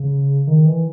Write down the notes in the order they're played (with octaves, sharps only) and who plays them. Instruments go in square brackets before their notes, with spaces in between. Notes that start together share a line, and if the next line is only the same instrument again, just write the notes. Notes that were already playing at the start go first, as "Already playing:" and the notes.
Already playing: [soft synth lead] C#3
D#3
E3